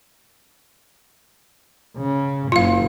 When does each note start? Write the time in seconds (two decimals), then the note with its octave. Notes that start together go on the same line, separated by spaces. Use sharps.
1.97 C#3
2.52 F#1 F4 F5